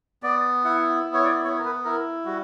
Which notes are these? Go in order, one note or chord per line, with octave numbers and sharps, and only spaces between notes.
B3 D5
E4 F#5
B3
C#5
D5
B3 C#5
A#4
B4
E4 A#4
G3 F#4